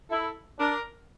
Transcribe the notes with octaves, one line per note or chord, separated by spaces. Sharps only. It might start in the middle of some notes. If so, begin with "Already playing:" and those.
E4 A4
D4 A#4